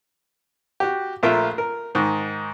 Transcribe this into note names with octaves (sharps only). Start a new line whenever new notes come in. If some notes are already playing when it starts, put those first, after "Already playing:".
F#4 G4
A#1 A3 F4 A#4 E5 F6
A#4
G#2 D#3